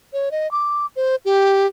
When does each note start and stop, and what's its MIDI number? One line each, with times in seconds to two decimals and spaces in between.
0.13 0.29 73
0.31 0.50 75
0.51 0.86 86
0.96 1.16 72
1.25 1.67 67